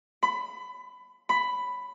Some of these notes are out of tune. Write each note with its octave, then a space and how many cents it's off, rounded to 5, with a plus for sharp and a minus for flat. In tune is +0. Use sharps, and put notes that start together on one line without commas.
B5 +20
B5 +10